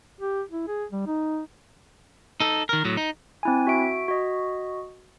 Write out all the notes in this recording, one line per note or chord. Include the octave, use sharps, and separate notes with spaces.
G4
E4
G#4
G3
D#4
D#4 A4
D#3 A#4
A2 F#3
D#4
C4 E4 G#5
F#4 E5 D7
F#4 D#5